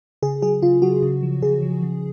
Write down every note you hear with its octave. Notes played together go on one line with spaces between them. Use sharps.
C#3 G#4
F#3 G#4
C#3 F4
F#3 F#4
C#3
F3
C#3 G#4
F3
C#3